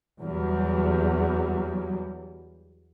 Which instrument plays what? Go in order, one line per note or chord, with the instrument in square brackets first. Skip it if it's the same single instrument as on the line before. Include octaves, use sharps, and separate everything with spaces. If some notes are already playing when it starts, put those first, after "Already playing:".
[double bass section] E2 F#3 G3